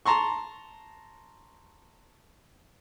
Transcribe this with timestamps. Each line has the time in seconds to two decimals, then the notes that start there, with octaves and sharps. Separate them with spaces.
0.06 A5 A#5 C6 C#6